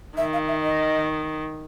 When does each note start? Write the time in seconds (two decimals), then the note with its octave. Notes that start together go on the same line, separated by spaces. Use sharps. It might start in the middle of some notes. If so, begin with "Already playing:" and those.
0.17 D#3 E5
0.33 F5
0.48 E5
0.63 D#5